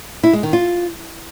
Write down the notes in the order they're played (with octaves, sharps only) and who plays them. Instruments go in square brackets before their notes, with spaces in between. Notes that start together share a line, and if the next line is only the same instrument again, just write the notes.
[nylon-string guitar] E4
G#3
D#3
F4